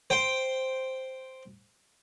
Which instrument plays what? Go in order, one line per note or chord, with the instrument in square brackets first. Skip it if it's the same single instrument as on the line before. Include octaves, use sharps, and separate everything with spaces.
[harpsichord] C5 G5